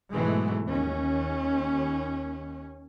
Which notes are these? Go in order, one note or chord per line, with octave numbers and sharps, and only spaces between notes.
G#2 B2 E3 F#3 G#3 A3
D#2 C#4